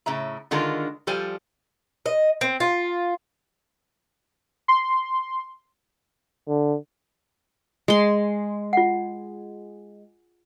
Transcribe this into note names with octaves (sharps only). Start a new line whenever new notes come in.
A2 C#3 E5 A#5
D3 D#3 G#3 F4 A4 A#4
F3 G3 A4 C5 G#5
D#5
C4
F4
C6
D3
G#3 C6
F4 F#5